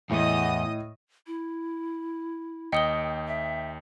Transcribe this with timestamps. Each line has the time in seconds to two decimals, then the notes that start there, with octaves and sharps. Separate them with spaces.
0.11 E2 A2 D#5 D#6
1.27 E4
2.72 D#2 D#5 G5 D#6 C#7 G7
3.28 E5